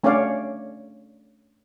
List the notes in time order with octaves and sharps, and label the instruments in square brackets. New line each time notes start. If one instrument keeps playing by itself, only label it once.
[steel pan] A3 C#4 D4 C#5 D5 F5